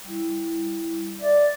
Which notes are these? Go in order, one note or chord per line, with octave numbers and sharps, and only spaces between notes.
G3 E4
D5 E5